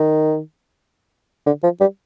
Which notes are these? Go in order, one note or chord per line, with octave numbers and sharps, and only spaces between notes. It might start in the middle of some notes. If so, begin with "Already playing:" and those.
Already playing: D#3
D3
F3
G3